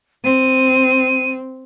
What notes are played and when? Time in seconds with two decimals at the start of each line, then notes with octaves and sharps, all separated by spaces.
0.24 C4 D#7